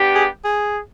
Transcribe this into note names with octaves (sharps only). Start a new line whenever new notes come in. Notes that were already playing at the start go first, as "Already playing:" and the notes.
Already playing: B3 D4 G4
G#4
G#4